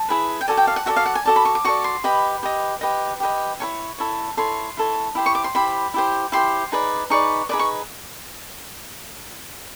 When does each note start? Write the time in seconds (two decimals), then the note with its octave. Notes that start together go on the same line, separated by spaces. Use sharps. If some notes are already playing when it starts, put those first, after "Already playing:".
Already playing: A5
0.09 E4 G#4 B4
0.41 G5
0.48 F#4 A4 D5 G#5
0.57 G5
0.67 F5
0.76 F#5
0.86 F#4 A4 D5 E5
0.96 F5
1.06 F#5
1.15 G#5
1.25 F#4 A4 D5 A5
1.36 B5
1.45 C#6
1.55 D6
1.65 F#4 A4 D5 C#6
1.84 C6
2.04 G4 B4 D#5 B5
2.43 G4 B4 D#5
2.81 G4 B4 D#5
3.20 G4 B4 D#5
3.60 E4 A4 C#5 C#6
3.98 E4 A4 C#5
4.37 E4 A4 C#5 C6
4.77 E4 A4 C#5
5.15 E4 G4 C5
5.26 C#6
5.35 D6
5.44 C6
5.55 E4 G4 C5 B5
5.94 E4 G4 C5
6.32 E4 G4 C5 C6
6.72 D#4 G#4 B4 D5
7.10 D#4 G#4 B4 D5 C#6
7.49 D#4 G#4 B4 D5 D6
7.59 C#6